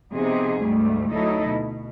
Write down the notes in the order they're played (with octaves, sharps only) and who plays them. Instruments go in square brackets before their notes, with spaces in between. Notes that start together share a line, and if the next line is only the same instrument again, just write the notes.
[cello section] C3 F3 B3 D#4 G#4
D2 G#2 G3 A3
D2 F#3 D#4 E4 A4 D#5
B2